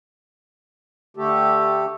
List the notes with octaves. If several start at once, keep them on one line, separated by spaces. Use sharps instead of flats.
D3 A3 G4 A4